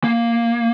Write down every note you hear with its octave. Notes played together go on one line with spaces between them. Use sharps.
A#3